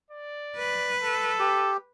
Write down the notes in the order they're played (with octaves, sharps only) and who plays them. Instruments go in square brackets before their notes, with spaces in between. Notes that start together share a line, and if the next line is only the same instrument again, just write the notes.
[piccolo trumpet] D5
[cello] B4
[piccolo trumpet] A4
[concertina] G4